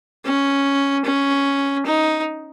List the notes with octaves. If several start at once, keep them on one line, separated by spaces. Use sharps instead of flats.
C#4
C#4
D#4